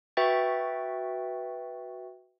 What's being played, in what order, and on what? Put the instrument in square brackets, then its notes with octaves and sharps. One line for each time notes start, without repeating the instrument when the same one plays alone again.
[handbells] F#4 B4 E5 G5 C#6 A6